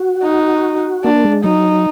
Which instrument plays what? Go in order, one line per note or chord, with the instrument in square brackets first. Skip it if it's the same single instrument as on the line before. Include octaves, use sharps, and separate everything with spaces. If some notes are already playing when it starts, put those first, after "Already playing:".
Already playing: [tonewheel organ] F#4
[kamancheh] D#4
[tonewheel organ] A#3 [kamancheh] D4
[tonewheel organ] G#3
[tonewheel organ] F#3 [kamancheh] D#4